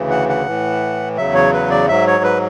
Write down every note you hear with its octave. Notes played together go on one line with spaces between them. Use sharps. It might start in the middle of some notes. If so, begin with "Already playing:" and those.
Already playing: D2 C#3 E3
F#5
F#5
A2 E3
E2 C#3 F#3 E5
C#5
B4
D5
G#2 F#3 E5
C#5
B4